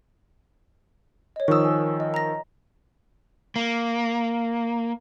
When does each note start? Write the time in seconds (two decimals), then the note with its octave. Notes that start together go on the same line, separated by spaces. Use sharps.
1.36 C#5 D#5
1.48 D#3 F3 C#6 D#6 E6
1.65 A#4 G#5
2.00 D#5
2.14 A#5 A#6
3.56 A#3